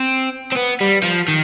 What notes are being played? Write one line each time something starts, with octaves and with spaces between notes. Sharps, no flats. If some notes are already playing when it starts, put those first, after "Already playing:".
Already playing: C4
C4
B3
G3
F3
D#3